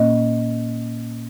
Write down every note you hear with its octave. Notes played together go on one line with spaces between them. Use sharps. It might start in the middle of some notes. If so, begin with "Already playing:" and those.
Already playing: A#2 A#3 C#4 D#5